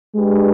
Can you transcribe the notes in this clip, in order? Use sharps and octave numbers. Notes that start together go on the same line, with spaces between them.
G#3 D4 G4 B4